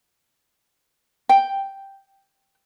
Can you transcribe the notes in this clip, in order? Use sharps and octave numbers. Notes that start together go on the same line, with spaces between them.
G5